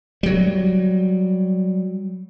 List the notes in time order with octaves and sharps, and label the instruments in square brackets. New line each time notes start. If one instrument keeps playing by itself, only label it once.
[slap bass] F#3 G3